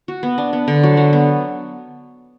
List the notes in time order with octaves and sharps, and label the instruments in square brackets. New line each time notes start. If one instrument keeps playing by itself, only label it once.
[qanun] F#4
B3
D4
B3
D3
F#3
F#3
B3